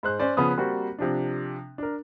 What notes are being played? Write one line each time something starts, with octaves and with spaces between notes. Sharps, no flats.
G#2 C5 F#6
C#4 C5 D5
C#3 F3 B3 D#6
G3 A#3 C4 F#4 C5
C3 F3 D4
D4 A#4